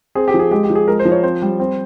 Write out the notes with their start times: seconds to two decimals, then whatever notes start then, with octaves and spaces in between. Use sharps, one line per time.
0.15 C4 G#4
0.28 G4
0.34 F3
0.39 G#4
0.51 G#3 G4
0.64 G4
0.70 F3
0.75 G#4
0.87 G#3 A#4
0.99 C5
1.05 F3
1.12 C#5
1.23 C4 C5
1.42 G3
1.60 C4